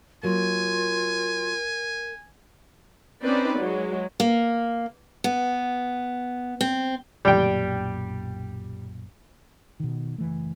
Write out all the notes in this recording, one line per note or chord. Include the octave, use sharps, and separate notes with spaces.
F#3 A#3 F4 A#4 G#5
C4 C#4 D#4 B4 D5
F#3 G#3
A#3
B3
C4
B1 F#2 A#2 G3 G5
B2 D#3
F#1 E3 A3